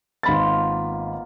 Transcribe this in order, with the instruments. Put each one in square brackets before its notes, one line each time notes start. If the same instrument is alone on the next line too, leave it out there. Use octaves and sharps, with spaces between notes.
[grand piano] G#1 B5 A6 [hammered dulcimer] A#3 B3 F4